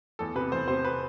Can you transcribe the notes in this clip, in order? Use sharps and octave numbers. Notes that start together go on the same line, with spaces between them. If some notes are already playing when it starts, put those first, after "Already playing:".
E2 A4
C3 B4
E2 C5
C3 C5
B4